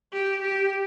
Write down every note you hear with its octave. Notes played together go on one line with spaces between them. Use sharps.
G4
G4